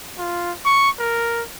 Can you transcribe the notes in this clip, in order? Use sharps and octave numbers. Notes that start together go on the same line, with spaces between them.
F4
C#6
A#4